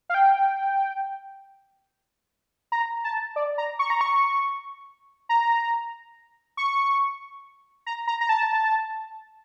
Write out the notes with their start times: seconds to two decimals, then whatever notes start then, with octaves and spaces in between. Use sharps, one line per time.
0.09 F5
0.14 G5
2.72 A#5
3.04 A5
3.36 D5
3.58 A#5
3.79 C#6
3.90 A#5
4.01 C#6
5.29 A#5
6.57 C#6
7.86 A#5
8.07 A#5
8.21 A#5
8.29 A5